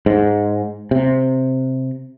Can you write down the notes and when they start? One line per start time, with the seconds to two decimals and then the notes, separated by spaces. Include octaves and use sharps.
0.06 G#2
0.91 C3